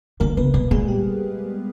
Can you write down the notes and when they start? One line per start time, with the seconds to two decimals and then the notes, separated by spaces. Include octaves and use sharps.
0.20 D3 A#3 A#4
0.30 A#4
0.37 C#3 B3 B4
0.54 B2 B3 B4
0.71 A#2 G#3 G#4
0.88 G3 G4